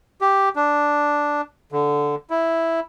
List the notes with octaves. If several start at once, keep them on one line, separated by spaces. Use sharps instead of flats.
G4
D4
D3
E4